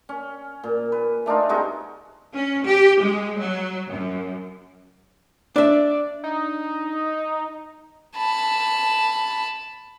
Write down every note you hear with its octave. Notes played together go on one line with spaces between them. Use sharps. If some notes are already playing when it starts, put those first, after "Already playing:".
C#4
A#2
B4
A3 D4 D#4 F4
C3 G#3 D#4 F#4
C#4
G4
G#3
F#3
F#2
D4 D5 E5
D#4
A5 B5